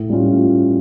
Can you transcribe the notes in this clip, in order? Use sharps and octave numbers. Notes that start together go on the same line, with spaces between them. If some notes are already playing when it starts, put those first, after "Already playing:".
Already playing: A2
G3 C#4 F4